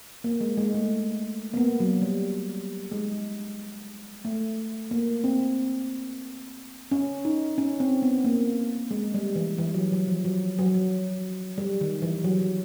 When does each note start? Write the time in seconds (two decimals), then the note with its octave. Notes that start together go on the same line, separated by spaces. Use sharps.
0.24 A#3
0.41 G#3
0.57 G#3
0.75 A3
1.54 A#3
1.57 B3
1.80 F#3
2.02 G3
2.92 G#3
4.25 A3
4.91 A#3
5.24 C4
6.92 C#4
7.25 D#4
7.58 C#4
7.80 C4
8.02 B3
8.24 A#3
8.91 G#3
9.14 G3
9.36 E3
9.58 E3
9.74 F#3
9.92 F#3
10.08 F3
10.25 F#3
10.59 F#3
10.74 F#3
11.58 G3
11.81 D#3
12.02 E3
12.24 F#3
12.42 F#3